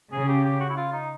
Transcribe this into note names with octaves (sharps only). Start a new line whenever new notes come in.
C#3 G#4
G4
G4
F#4
E4
F4
D#4